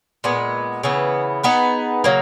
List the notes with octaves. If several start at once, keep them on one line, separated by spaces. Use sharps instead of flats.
A#2 G#3 B3
C#3 E3 B3
B3 D#4 G#4 B4
C#3 F#3 A#3